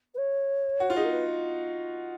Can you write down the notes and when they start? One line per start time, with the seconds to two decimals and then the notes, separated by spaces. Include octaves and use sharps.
0.14 B4
0.17 C#5
0.80 F#4
0.90 F4
0.96 D#4 G#4
1.04 A#4
1.11 B4